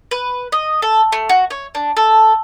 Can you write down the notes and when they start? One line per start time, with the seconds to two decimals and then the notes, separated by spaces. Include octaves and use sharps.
0.11 B4
0.52 D#5
0.82 A4
1.12 A3
1.29 F#4
1.50 C#5
1.75 D4
1.97 A4